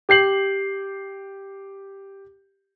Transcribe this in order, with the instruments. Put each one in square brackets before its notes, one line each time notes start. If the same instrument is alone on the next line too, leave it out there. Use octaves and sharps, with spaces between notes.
[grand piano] G4 G6 C7 F#7